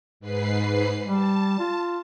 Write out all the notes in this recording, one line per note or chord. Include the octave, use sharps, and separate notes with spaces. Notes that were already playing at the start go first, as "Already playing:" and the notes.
G#2 B4 C7
G3 A5
F4